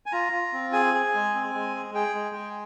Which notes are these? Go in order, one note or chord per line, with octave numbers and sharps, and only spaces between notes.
G#5
F4 A#5
F4
C4
G#4 G#5
G#4
G#3
C4
G#3
G#4
G#4 G5
G#3
G#4